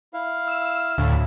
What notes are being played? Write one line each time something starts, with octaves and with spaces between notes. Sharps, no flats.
E4 F5
E6
D2 A2